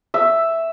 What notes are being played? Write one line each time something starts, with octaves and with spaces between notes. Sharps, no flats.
E5